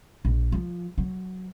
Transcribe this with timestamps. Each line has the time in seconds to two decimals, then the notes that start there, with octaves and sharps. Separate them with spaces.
0.25 A#1
0.52 F3
0.98 F#3